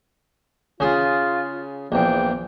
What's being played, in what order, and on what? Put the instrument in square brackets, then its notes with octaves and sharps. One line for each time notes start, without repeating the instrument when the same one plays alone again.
[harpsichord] C#3 G#4 D#6 [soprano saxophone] F4
[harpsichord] A#1 E2 [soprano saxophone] G5